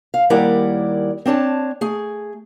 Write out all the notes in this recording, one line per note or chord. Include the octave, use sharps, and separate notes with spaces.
F5
D#2 G3 E4 A#4 D5 F#5
C4 D4 C#5 A5
A3 G#4